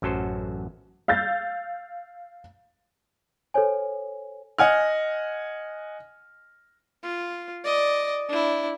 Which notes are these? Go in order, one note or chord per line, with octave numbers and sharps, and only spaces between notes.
A1 F#2 F#3 A4 C5
F5 E6 G6 A6
A4 C5 C#5 G#5
D#5 F#5 G#5 F6
F4
D5 D#5
D4 E4